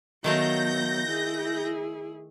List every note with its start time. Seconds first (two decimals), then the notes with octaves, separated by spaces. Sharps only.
0.24 D#3 F#3 A3 B3 F4 G6 A#6
1.07 E4 G#4